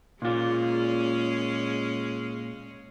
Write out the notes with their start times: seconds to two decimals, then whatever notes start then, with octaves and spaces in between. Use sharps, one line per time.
0.22 A#2 G#3 C#4 F4 G#4